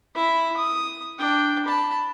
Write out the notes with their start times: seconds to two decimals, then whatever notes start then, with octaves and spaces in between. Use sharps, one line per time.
0.14 E4 E5
0.57 D#6
1.19 D4 G5
1.66 A5 B5